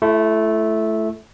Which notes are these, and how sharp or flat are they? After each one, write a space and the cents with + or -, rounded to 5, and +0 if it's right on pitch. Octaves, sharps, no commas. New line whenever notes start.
A3 -10 E4 +35